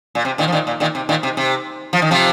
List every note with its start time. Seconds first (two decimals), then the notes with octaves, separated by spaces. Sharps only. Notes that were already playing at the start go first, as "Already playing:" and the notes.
0.15 A#2
0.25 C3
0.38 A#2 D#3
0.48 F3
0.52 A#2 D#3
0.67 A#2
0.80 A#2 D#3
0.95 C3
1.09 A#2 D#3
1.23 C3
1.37 C3
1.93 F3
2.02 D#3
2.11 C3 F3